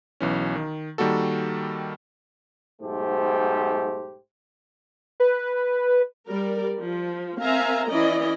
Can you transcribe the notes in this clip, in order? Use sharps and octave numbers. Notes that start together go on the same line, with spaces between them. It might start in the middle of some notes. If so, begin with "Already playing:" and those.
B1 E3 C#4
D#3
D#3 G3 A#3 F#4 A4
B1 G#2 A3 G4 C5
B4
G3 A#4 D5
F3
C4 A#4 E5 F5 G#5 A#5
E3 C#4 E4 D5 D#5